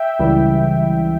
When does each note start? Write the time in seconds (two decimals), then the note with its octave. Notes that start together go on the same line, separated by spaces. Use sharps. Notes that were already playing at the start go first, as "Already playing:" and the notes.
Already playing: E5 G5
0.19 C#2 C#3 E3 G3